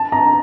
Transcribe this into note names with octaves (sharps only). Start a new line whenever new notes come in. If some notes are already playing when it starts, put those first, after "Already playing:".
Already playing: A5
A#5